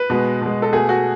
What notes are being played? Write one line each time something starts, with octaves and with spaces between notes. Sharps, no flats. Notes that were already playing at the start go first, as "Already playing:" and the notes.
Already playing: B4
B2 G#3
B2 G#3
A4
B2 A3 G#4
F#4